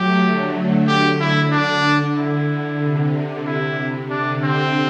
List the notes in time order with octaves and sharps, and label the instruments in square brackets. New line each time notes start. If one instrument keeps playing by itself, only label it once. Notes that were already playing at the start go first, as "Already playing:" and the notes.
Already playing: [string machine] F#3 A3 [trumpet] G4
[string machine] D3
[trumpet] G4
E4
[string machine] D3 [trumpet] D4
[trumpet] E4
[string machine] C3
[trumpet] E4
[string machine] D3 [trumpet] D4
[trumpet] C4